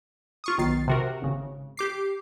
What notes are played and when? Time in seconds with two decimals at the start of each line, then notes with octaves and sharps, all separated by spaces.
0.44 F4 C#6 D#6
0.58 B1 D#3 A6 C7
0.88 C3 F#4 A#4
1.22 G#1 C#3
1.77 G4 D6 C7